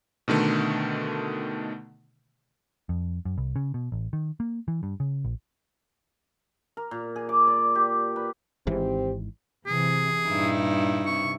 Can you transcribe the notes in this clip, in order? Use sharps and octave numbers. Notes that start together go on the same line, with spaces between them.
B2 D3 D#3 A3
F2
F#2
C2
C#3
B2
A1
D#3
A#3
E3
G2
C#3
A#1
A#4
A#2
G#4
D6
D5
G4
B4
G#1 G#2 E3 C4 G4
C3 E3 G#4
G2 A#2 D#4 E4
C3 C#6